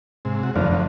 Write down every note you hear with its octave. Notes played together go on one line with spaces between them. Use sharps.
G#2 C3
C3 F#4
F1 F#2 D3 F4
F#2 D3